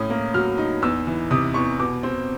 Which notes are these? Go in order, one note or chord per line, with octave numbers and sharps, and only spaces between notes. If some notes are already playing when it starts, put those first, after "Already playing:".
Already playing: A2 C#4 D#6
A#3
F#3 F6
D#4
E2 E6
E3
C3 D#6
E2 C#6
B2 D6
C4